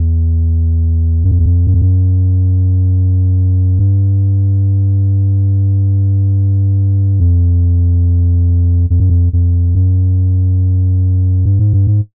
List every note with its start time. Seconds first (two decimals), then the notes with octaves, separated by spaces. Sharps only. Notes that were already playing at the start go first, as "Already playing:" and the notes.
Already playing: E2
1.24 F#2
1.31 F2
1.39 E2
1.46 F2
1.67 F#2
1.74 F2
1.82 F#2
3.79 G2
7.20 F2
8.90 F2
9.00 F#2
9.10 F2
9.33 F2
9.75 F#2
11.45 G2
11.59 G#2
11.73 G2
11.87 G#2